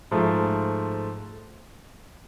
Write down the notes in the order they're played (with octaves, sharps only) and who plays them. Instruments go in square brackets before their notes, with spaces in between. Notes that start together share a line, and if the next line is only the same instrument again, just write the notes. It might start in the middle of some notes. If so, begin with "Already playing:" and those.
[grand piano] G#2 F3 A3